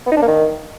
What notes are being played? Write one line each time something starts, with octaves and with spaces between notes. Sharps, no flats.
B3
D#4
D4
A#3
D#3